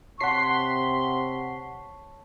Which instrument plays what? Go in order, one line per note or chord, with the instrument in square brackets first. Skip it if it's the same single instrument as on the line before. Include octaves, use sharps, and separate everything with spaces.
[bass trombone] C3 [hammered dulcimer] C#5 A5 [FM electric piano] F#5 B6 C7 [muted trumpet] C6